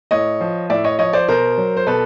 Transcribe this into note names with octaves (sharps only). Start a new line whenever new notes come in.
A2 C#5 D#5
F3
A2 D5 E5
C#5 D#5
F3 C#5 D#5
C5 D5
B2 A#4 C5
F#3
C5
B2 A4 B4